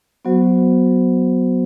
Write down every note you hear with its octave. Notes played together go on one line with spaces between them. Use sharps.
F#3 B3 F#4 C5